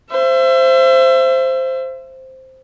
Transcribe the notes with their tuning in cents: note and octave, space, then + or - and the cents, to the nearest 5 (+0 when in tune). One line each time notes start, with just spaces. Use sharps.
C5 +0 E5 +35